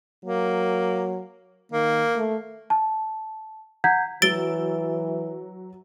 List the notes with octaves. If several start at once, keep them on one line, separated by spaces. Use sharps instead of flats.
F#3 A#3
D#3 A#3
A3
A5
F#5 A#5 G6 G#6 B6
E3 F#3 E6 A6 D7 G7